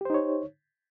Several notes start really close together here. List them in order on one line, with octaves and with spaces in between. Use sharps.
G4 C5 D#4 C#5